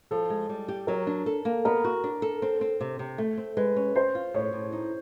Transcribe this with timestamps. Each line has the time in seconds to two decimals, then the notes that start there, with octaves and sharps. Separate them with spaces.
0.11 F3 A4
0.30 G#3
0.49 G3
0.68 G4
0.87 F#3 A#4
1.07 D4
1.26 A4
1.45 A#3
1.65 B3 A#4
1.84 F#4
2.04 D4
2.22 A4
2.42 C4
2.61 C4
2.81 C3
2.99 C3
3.18 A3
3.38 C4
3.57 G#3 B4
3.76 C#4
3.95 C4 C5
4.15 F4
4.34 A2 C#5
4.53 A2
4.72 D#4